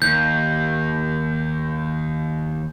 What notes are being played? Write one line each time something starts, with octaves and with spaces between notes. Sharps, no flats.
D#2 G6